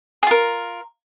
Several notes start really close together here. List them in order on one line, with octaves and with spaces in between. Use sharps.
G#4 F4 A#4